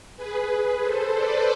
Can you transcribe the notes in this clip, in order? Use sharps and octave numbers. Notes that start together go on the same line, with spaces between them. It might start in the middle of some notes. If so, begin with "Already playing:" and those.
G#4 B4
G#4 B4
A4 C5
B4 D5